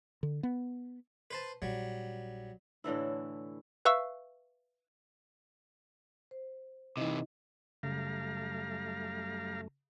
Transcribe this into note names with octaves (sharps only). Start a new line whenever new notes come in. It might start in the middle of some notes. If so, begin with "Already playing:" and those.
D3
B3
B4 C5 A5
A#1 F#3 G3
A2 D3 E3 E4
B4 E5 F5 C#6 E6
C5
C3 E3 D#4 E4 D#5
F#2 C#3 G3 A3 F5 A#5